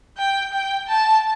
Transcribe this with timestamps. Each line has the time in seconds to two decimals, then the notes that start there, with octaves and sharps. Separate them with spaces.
0.17 G5
0.53 G5
0.87 A5